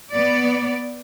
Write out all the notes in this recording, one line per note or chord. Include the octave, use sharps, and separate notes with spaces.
B3 D5